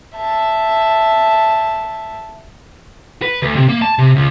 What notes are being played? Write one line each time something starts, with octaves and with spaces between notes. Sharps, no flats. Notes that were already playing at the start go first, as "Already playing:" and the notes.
E5 A5
B4
D2
C3
A#3
A5
C3
C#2